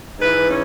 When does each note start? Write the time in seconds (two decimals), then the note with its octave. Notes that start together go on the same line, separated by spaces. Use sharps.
0.20 G#2 E3 B4
0.48 C#4